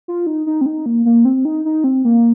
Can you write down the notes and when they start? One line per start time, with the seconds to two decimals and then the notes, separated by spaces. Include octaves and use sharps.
0.08 F4
0.27 D#4
0.47 D#4
0.61 C4
0.66 D#4
0.86 A#3
1.05 A#3
1.25 C4
1.45 D#4
1.65 D#4
1.84 C4
2.05 A#3